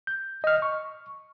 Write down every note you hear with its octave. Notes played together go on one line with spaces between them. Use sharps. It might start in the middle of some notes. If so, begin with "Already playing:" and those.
G6
D#5 F6
C#6